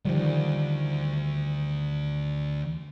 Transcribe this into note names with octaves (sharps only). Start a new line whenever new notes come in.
D2 D#3 F3 G3